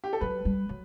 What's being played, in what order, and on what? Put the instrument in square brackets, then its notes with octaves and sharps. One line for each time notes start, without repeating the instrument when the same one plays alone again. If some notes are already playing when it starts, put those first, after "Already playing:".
[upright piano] G4
A4
[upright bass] F#3 [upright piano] B4
[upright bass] G3
F#3